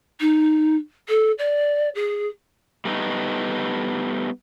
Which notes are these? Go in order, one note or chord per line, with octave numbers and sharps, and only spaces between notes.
D#4
A4
D5
G#4
G3 A3 B3 D#4